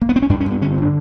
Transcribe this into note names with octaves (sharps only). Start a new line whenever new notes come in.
A#3
B3
C4
C#4
G2 D4
C#4
G2
B3
D3 C#4
C4
D3 D4